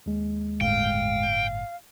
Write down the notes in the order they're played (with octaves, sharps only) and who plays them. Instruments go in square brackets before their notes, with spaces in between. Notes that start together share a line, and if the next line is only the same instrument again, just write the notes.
[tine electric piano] D#2 G#3
[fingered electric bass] G1 A2 [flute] F5 [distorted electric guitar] G5